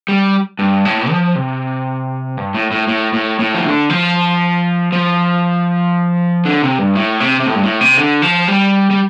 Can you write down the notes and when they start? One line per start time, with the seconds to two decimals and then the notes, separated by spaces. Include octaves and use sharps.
0.08 G3
0.59 G2
0.85 A2
1.10 F3
1.35 C3
2.37 G2
2.54 A2
2.71 A2
2.88 A2
3.13 A2
3.40 A2
3.54 F3
3.65 D3
3.90 F3
4.92 F3
6.45 D3
6.62 C3
6.79 G2
6.95 A2
7.20 C3
7.40 C3
7.46 A2
7.55 G2
7.63 A2
7.81 C3
7.97 D3
8.22 F3
8.48 G3
8.90 G3